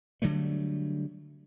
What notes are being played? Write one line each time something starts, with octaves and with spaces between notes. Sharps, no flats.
D3 F#3 G3 A3